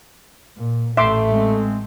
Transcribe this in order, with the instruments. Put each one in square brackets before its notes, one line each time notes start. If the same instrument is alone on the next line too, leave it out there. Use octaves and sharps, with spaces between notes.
[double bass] A#2
[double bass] A1 [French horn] A3 [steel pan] E5 C6 D6
[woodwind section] G#3 C4